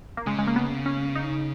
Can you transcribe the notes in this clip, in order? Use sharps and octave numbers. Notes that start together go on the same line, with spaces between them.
A#3
C#3 G#3
G#3
A#3
B3
C#4
D#4